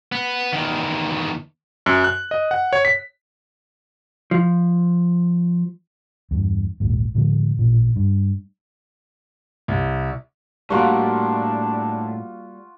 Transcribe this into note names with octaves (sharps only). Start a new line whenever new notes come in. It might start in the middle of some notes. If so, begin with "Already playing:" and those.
B3
E2 D#3
F#2
F#6
D#5
F#5
C#5
B6
F3
E2 G2
A#1 D#2 G#2
A2 D3 F3 G#3
A1 A#2
G2
C2
A2 G3 A#3 D4 F4 F#4 F#5 C#6